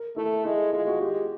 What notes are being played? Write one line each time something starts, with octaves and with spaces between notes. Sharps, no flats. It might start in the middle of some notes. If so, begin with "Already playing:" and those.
Already playing: A#4
A3 E4
G#3 E4
G#3 F4
F#4
G#3 G4